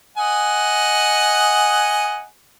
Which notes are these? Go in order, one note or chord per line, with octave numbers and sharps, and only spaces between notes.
D#5 F#5 G#5